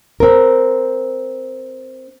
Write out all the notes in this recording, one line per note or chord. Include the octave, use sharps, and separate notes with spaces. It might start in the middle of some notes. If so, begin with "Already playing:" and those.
C4 A#4